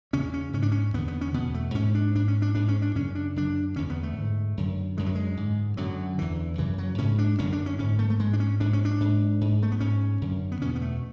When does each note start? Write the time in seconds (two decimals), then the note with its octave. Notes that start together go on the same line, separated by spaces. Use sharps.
0.13 E2 C#3 C#4
0.34 C#4
0.53 G#2 C#4
0.62 D4
0.72 C#4
0.94 E2 D3 B3
1.08 B3
1.21 C#4
1.34 E2 B2 B3
1.54 A3
1.74 G#2 C#4
1.95 D4
2.15 G#2 D4
2.28 C#4
2.42 D4
2.55 G#2 D4
2.68 C#4
2.82 D4
2.95 F#2 C#3 C#4
3.15 D4
3.36 F#2 D3 D4
3.76 E2 D3 C#4
3.90 B3
4.03 A3
4.16 G#2
4.57 F#2 D3
4.97 F#2 D3 G#3
5.06 F#3
5.15 G#3
5.37 G#2
5.77 F#2 D3 F#3
6.18 E2 D3 E3
6.58 F#2 C#3 E3
6.78 F#3
6.98 G#2 C#4
7.18 D4
7.39 F#2 D3 C#4
7.52 D4
7.66 C#4
7.79 G#2 C#4
7.99 A3
8.10 A3
8.19 G#2 G#3
8.33 D4
8.40 C#4
8.60 G#2 D4
8.73 C#4
8.85 D4
9.00 G#2
9.41 G#2
9.63 A3
9.72 B3
9.80 G#2 C#4
10.21 F#2 D3
10.52 B3
10.61 E2 B2 C#4
10.75 B3
10.81 A3